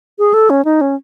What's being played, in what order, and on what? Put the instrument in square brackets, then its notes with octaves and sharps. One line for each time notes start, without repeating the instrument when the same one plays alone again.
[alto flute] G#4
A4
C#4
D#4
C#4